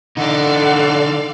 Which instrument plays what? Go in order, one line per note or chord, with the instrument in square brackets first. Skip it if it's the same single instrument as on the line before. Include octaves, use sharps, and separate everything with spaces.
[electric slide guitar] D3 D#4 [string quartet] A4 D5 F5 [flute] F#5